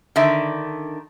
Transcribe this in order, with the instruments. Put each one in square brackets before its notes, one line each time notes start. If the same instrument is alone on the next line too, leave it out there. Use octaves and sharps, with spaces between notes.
[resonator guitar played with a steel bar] D3 D#3 E5